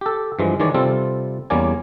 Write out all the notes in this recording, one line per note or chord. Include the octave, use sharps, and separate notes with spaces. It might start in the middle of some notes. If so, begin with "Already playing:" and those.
G4 A4
G2 E3 F3 G#3
D#3 E3 G#3 C#5 D5
C3 G3 C4 F4 A4
E2 G3 A#3 C#4 D5 G#5